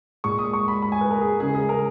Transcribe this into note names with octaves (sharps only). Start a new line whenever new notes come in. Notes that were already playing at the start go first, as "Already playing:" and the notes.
A#2 G#3 C#6
D#6
C#6
B5
B5
G#5
B4
A#4
G#4
C#3 G#3 G#4
G#4
A#4